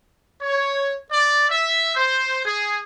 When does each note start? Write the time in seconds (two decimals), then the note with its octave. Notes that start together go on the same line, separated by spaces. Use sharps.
0.41 C#5
1.11 D5
1.49 E5
1.96 C5
2.46 G#4